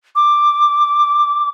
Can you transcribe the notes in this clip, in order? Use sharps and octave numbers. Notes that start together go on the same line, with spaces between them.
D6